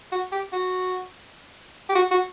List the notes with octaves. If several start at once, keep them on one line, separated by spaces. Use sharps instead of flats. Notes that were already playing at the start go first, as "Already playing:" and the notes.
F#4
G4
F#4
G4
F#4
F#4